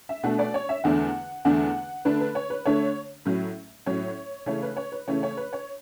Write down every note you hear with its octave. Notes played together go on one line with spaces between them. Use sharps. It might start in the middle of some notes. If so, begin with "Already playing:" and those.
E5
B2 A3 D4 F#5
D5
C#5
E5
E2 D3 A3 D4 F#5
E2 D3 A3 D4 F#5
D3 A3 D4 B4
B4
C#5
B4
D3 A3 D4 C#5
A2 F#3 C#4
A2 F#3 C#4 C#5
C#3 E3 A3 C#4 C#5
B4
C#5
B4
C#3 E3 A3 C#4 C#5
C#5
B4
C#5